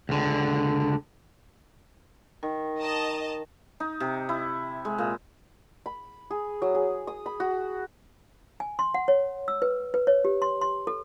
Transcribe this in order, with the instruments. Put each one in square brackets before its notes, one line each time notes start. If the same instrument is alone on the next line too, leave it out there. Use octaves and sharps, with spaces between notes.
[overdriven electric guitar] C#2 D3
[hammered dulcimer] D#3
[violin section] D#5 A5 A#5
[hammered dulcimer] D#4
C3
E4
G#3
A#2
[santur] B5
G#4
F#3
G#4
D#6
B5
F#4
[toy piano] G#5
C6
F#5
C#5
E6
B4
B4
C#5
G4
C6
C6
A4